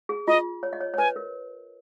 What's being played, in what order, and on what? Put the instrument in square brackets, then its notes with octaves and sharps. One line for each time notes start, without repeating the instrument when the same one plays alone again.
[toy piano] G#4
[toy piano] F4 [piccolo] D#5
[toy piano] C#5
D#5
C#5
C#5
[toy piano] B4 [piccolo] G#5
[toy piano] A#4